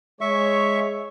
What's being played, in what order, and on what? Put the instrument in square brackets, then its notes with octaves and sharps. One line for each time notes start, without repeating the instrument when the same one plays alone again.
[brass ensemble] G#3 C#5 [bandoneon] E5 C#6